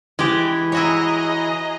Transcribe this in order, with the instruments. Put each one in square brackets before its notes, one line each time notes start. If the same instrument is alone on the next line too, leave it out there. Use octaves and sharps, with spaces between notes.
[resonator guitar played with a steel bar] E3 [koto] G#3 G4
[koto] E4 F#4 C#5 [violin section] G#4 D#5 A#5